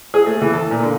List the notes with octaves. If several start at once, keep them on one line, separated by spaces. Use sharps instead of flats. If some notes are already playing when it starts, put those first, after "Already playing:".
G#4
A3
E3
A4
A#2
D3